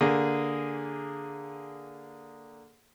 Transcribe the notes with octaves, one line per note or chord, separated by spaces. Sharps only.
D3 A#3 G#4